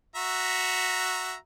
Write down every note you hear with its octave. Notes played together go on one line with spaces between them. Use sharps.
F#4 E5 A#5